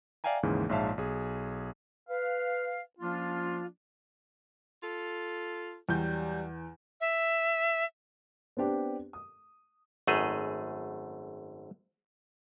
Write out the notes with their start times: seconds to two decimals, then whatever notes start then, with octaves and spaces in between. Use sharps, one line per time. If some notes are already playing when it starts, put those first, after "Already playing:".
0.24 D5 E5 F5 G5 G#5 A#5
0.43 D#2 G#2 C#3 E3
0.69 A#1 G#2 C#5 E5 F5 A5
0.98 B1 G#4
2.08 B4 F5
2.99 F3 A#3 C#4 D4 F4
4.82 F4 A4
5.89 E2 F#3 G3 G6
7.01 E5
8.57 B3 C4 D4 G4
9.13 D#6
10.07 G#1 F#2 A3 G#4 D#5